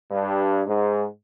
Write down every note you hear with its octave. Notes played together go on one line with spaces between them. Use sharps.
G2
G#2